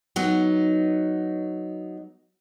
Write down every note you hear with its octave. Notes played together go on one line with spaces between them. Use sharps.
F#3 B3 D#4